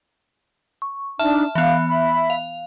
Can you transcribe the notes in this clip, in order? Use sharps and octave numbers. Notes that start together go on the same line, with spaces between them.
C#6
D4 D#4 E5 A5 F6
E3 B3 F5
E5 B5
F5